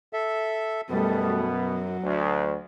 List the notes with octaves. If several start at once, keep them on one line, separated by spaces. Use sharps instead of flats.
A4 E5
F#2 B2 G3 A3 B3
F#3
D2